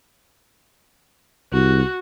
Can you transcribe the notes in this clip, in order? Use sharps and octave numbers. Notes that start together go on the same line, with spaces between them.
C2 F#4